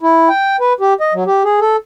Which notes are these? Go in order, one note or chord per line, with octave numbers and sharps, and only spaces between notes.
E4
G5
B4
G4
D#5
F#3
G4
G#4
A4